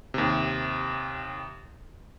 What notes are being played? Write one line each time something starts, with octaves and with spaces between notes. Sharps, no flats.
D#2 C3